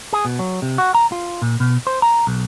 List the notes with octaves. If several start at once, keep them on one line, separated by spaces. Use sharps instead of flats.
G#4
B2
F#3
C3
F#4
A#5
F4
A#2
B2
C5
A#5
B1